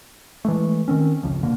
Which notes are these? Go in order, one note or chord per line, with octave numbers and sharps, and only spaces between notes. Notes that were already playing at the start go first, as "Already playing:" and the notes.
E3 G#3 A3
D#3 C4 C#4
G1 C#2 C#3 F3
B2 D3 A#3